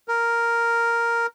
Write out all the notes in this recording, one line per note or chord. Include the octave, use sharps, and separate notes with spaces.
A#4